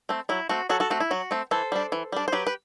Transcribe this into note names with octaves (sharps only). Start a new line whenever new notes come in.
A3 C4
F#3 E4
A3 C4 F#4
F#3 F#4 A4
F#4 A4
A3 C4 F#4
E4
F#3 F#4
A3 C4
E3 A4 C5
G3 D4
E3
G3 D4
C5
F#3 G4 B4
B4